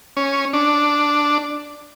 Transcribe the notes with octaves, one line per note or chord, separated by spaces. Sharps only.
C#4
D4